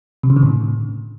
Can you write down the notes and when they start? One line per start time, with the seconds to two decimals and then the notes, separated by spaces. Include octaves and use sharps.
0.23 C3
0.30 C#3
0.36 D3
0.43 A2